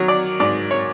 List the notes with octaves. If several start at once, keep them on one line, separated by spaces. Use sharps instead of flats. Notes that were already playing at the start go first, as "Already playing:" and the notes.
Already playing: D#3 F#3 C#5
D5
G#2 D5
C#5